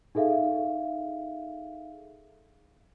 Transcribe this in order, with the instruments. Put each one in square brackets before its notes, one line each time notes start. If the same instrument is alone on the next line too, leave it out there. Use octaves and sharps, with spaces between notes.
[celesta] D#4 G#4 A4 E5 F5